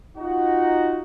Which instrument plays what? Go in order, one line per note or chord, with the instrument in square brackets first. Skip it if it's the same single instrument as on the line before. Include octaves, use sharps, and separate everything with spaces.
[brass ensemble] D#4 F4 F#4